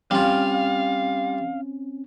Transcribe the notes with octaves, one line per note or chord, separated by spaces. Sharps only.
G3 C4 C#4 F4 F5